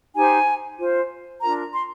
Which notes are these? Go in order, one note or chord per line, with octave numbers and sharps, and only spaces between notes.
D#4 G4 C5 G#5
F4 C5
D4 F4 A#4 A#5
C6